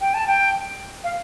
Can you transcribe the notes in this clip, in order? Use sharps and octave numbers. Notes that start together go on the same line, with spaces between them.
G5
A5
G5
F5